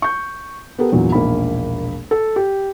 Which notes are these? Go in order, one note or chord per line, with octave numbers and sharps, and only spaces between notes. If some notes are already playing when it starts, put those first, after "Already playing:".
C#6 G6
B3 G4 A4 A#4
E2 G2 A#2 F#3
E1 A#1 A#3 D#4 B5
A4
G4